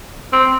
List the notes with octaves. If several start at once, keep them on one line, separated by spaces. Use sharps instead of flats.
C4